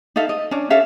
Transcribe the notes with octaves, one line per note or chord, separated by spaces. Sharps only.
D#4 A4 E5 F5
D#5
C#4 D4
C#4 A4 E5 F5